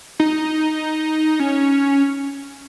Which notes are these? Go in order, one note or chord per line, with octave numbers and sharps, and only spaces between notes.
D#4
C#4